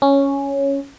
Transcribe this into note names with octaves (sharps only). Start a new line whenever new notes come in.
C#4